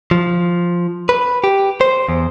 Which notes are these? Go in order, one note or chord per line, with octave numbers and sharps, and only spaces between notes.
F3
B4
G4
C5
E2